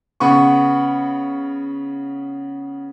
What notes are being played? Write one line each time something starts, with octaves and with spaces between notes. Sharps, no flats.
C#3 B3 C#6